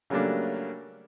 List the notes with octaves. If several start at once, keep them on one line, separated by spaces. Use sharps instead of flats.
C#3 F#3 G3 A3 A#3 D4